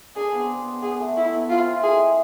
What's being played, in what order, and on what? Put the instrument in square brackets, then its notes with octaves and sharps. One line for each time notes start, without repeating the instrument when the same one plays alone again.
[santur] D4 [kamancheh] G#4
[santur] B3 C4
B3
[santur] B3 [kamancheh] G#4
[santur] A3
[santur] A3 [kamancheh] E4
[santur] B3
[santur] C4 [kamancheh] F4
[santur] E4
[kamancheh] G#4
[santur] G#3 G#4